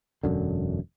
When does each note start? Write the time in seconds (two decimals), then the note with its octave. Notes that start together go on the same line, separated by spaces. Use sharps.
0.23 E1 F#2 D3